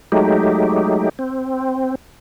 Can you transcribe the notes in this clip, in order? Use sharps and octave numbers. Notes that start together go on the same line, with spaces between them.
F#3 G#3 A3 D#4 G4
C4